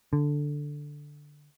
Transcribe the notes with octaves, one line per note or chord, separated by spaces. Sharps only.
D3